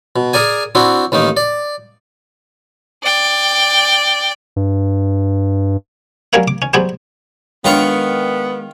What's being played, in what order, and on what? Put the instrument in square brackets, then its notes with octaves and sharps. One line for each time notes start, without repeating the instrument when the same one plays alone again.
[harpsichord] B2
G#4 A#4 D5 G#5
C4 D4 E4 F#4
A1 D#3 A#3 D#4
D5
[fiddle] D5 G5
[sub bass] G2
[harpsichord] F#3 G3 C#4 A#4 C#5 F5
D6
C#4
F#3 G3 B3 G#4 C5 D5
[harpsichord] D#3 F4 C#6 [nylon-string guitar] G#3 [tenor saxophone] B3 [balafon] D4 C#5